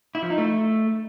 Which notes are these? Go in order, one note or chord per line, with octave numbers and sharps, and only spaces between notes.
E4
F3
D#4
A3